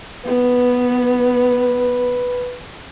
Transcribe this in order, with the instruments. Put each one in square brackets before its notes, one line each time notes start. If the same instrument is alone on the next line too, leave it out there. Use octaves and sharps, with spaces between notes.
[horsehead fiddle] B3 [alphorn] B4